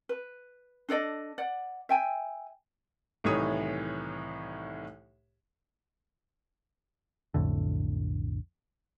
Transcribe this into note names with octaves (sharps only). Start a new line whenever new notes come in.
B4
D4 A4 D5 D#5
D5 F#5
E5 G5 G#5
C2 A2 D#3 E3 C#5 D#6
B1 F2 A2 D3